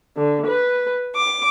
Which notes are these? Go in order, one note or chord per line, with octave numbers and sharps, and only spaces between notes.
D3
B4
D6